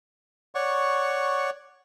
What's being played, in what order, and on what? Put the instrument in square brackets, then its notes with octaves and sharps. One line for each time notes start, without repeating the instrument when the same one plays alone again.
[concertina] C#5 D5 F#5 C#6